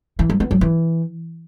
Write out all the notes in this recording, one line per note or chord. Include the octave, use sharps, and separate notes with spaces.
E3
G3
B3
F#3
E3